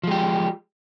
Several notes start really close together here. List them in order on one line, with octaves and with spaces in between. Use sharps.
F3 G#3 G4